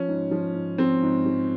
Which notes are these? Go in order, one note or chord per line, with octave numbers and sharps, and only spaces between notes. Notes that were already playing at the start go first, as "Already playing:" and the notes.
Already playing: F3 C#4
G#2
F3
G#2
F3 C4
G#2
F3